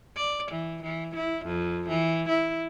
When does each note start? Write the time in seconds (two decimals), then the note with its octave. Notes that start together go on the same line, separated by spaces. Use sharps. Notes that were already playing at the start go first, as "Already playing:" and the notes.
0.16 D5
0.51 E3
0.82 E3
1.16 E4
1.45 F2
1.89 E3
2.29 E4